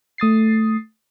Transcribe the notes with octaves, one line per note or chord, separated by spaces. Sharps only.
A3 D#6 A6 C7